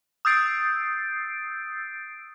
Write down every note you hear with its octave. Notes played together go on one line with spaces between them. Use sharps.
D#6 E6 G6 A6 C7 D7